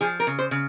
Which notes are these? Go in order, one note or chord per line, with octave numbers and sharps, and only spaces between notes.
F3 G#4
A#4
C#3
C5
C#3